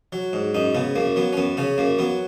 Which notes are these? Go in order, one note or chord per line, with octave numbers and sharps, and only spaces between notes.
F#3
G#2
F#2 D#4
C#3 B3
F#2 A#3
F#3 B3
C#4
F#2 B3
C#3 C#4
F#2 A#3
F#3 B3